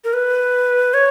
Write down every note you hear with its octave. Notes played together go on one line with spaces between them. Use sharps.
A#4
B4
C#5